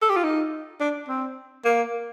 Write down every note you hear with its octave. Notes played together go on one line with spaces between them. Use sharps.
A4
G4
F4
D#4
D4
C4
A#3